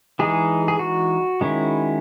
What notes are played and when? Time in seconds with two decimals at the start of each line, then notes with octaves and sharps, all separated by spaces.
0.19 E3 G#3 D#4 G#4
0.68 G#4
0.79 F#4
1.41 D#3 G#3 C#4 E4